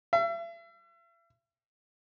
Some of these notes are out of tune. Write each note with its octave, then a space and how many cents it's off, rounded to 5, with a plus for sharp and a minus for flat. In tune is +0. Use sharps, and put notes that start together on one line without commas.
E5 +40